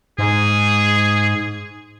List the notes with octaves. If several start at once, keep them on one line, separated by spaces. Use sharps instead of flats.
G#2 G#4